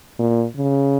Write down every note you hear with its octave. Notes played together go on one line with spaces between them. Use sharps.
A#2
C#3